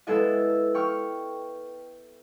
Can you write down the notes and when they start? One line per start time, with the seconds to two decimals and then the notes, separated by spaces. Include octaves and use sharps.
0.07 G#3 B3 E4 A4 D#5 E5
0.74 G5 C#6 F6